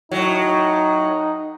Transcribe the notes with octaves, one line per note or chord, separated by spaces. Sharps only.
A2 F#3 D#4